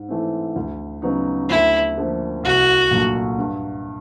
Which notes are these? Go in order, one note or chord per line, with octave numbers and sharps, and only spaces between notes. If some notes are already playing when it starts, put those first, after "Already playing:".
Already playing: G#2
E3 A3 C4
D2
C#3 F#3 B3 D#4
D2 E4
D3 F3 A#3
C2 F#4
A#2 F#3 A3 D4
G2